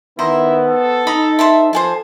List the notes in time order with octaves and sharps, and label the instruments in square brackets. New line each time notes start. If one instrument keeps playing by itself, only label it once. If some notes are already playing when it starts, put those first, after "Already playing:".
[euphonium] D#3 [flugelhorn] B3 [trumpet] E4 [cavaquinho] C5 D#5 A#5
[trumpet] A4
[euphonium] D#4 [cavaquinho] D#5 A#5 B5
[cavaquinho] C5 A5 B5 [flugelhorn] E5
[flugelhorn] F3 [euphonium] A4 [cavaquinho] C5 G#5 A5